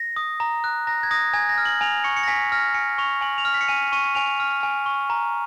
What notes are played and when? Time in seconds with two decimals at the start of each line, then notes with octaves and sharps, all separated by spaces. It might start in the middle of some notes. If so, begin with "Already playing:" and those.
Already playing: A#6
0.16 D#6
0.40 A#5
0.64 F#6
0.87 A#5 A#6
1.03 G#6
1.11 D#6 A#6
1.33 G#5 G#6
1.49 A#6
1.58 F6
1.65 F#7
1.81 G#5 F7
2.04 C#6 C#7
2.16 C#7
2.23 A#6
2.28 G#5 B6
2.52 F6 A#6
2.74 G#5 C#7
2.98 C#6 F7
3.21 G#5 F#7
3.38 F7
3.45 F6
3.54 B6
3.61 C#7
3.68 G#5 D#7
3.92 C#6 D#7
4.15 G#5 F7
4.40 F6
4.63 G#5
4.86 C#6
5.10 A#5